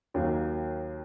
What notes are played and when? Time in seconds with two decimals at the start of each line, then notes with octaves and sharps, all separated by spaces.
0.14 D#2 D#3 F#3 A#3